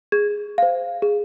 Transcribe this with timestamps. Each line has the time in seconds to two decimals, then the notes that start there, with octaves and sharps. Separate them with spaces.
0.12 G#4 G#6
0.58 C5 F5
1.02 G#4